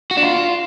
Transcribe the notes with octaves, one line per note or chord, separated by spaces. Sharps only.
F#4
D4
F4